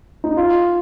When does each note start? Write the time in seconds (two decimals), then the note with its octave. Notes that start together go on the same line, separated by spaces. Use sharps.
0.24 D#4
0.37 F4